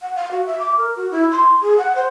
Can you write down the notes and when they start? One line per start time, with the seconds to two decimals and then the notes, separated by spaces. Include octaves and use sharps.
0.02 F#5
0.15 F5
0.31 F#4
0.46 E5
0.60 D6
0.77 A#4
0.96 F#4
1.11 E4
1.32 C6
1.61 G#4
1.78 F#5
1.96 C5